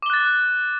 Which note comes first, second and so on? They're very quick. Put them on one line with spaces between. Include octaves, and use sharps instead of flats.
D6 G7 F#6 A6